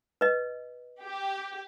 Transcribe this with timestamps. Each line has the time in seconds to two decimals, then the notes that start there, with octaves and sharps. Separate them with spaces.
0.21 B4 D#5
1.03 G4